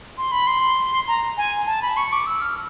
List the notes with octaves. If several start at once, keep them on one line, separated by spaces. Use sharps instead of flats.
C6
B5
C6
A#5
G#5
A5
B5
C#6
D6
E6
F6